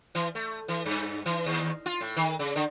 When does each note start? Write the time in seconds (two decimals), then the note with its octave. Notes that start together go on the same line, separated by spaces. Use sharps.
0.15 E3
0.35 A3
0.68 E3
0.86 G2
1.26 E3
1.46 D#2
1.86 F4
2.01 A2
2.16 D#3
2.39 C#3
2.56 D3